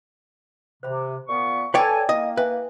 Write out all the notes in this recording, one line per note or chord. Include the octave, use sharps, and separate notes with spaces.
C3 C5 B5
A#2 B3 C#6
A4 B4 C#5 D5 G5 G#5
A#3 E4 D#5
B4 E5 G#5